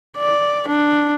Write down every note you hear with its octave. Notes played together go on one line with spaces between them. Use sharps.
D5
D4